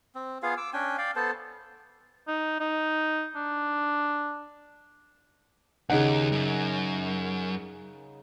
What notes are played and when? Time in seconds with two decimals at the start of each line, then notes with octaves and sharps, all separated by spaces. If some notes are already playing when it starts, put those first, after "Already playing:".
0.15 C4
0.43 B3 F4 G#4 F5
0.57 D6 E6
0.73 C#4 D4 G5 G#5
0.98 D5 F5 G5
1.16 B3 A4 C5 A5
2.28 D#4
2.60 D#4
3.36 D4
5.90 D#2 C#3 D#4 F#5
6.32 F#2